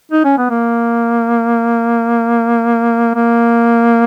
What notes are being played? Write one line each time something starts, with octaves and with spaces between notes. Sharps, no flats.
D#4
C#4
B3
A#3
A#3